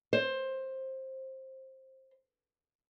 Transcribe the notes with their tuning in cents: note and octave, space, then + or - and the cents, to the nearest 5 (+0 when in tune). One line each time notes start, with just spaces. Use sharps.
C5 +15